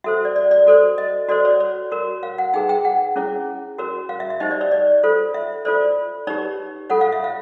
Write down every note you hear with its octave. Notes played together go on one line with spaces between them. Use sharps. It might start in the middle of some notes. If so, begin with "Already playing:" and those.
F#4 A4 C5 E5
D5
D5
D5
F#4 A4 C5
D#5
F#4 A4 C5 D5
C#5
C#5
F#4 A#4 C#5
F5
F#5
D#4 G#4 B4 G5
G5
F#5
C#4 E4 G#4 C#5
F#4 A#4 C#5
F5
E5
E5
D#4 G4 C5 D#5
D5
C#5
D5
F4 A4 C5
E5
F4 A4 C5 D5
D#4 G4 B4 C#5
F4 A4 C#5 F#5
F5
E5
F5